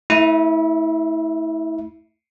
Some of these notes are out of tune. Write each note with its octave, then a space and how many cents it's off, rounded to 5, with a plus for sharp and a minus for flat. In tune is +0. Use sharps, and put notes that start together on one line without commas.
A3 +0 E4 -30 E5 +15